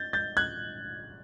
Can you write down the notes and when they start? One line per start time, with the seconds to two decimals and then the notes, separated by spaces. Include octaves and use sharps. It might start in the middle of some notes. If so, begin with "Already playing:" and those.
Already playing: G6 A6
0.13 G6 A6
0.37 F#6 G#6